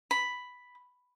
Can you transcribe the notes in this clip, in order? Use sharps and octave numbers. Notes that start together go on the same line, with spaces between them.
B5